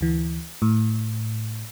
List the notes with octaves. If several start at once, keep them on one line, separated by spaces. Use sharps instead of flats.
D2 E3
A2